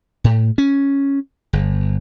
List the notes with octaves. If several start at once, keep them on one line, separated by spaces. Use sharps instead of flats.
A2
C#4
G1